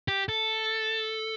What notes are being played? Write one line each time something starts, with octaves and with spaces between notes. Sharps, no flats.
G4
A4